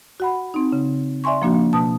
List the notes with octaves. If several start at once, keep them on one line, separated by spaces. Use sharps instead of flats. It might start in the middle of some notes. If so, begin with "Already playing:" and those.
F#4 F#5 B5
C4 D#4
C#3
D5 E5 G#5 C6 C#6
F3 A#3 D4 F#4
B2 A5 D#6